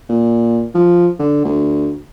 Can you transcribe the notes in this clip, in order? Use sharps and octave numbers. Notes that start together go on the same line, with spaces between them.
A#2
F3
D3
D2